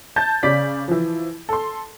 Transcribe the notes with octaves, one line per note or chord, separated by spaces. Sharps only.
A5 G6 A6
C#3 C#4 D5 B6
E3 F3
A4 C6